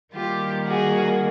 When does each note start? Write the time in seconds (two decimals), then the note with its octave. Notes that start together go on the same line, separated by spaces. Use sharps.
0.14 D#3 G3 A#3 F4 G4
0.66 F#4 G#4